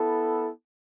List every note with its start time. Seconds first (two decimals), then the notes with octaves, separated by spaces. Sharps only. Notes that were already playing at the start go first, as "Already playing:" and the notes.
Already playing: B3 E4 A4